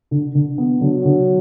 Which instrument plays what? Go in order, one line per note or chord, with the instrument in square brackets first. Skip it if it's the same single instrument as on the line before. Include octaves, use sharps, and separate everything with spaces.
[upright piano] D3
D3
B3
[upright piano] D3 [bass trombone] F#3
[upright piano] D3